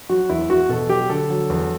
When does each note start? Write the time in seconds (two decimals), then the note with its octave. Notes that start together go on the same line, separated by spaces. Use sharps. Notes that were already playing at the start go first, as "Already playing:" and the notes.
0.09 F#3 F#4
0.29 E2 E4
0.49 E2 F#4
0.69 B2 A4
0.89 F#3 G4
1.10 D3 A4
1.30 F#3
1.50 E2